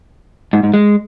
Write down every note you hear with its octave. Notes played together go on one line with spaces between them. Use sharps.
G#2
G#2
G#3